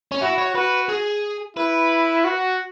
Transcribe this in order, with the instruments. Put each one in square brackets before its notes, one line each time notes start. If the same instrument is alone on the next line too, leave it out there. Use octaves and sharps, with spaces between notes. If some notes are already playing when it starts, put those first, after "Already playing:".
[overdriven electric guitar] C#4
[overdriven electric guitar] E4 [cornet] F#4
[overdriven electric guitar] C#5
[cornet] F#4 [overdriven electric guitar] B4
[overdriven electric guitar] G#4
[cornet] E4 [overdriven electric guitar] B4
[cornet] F#4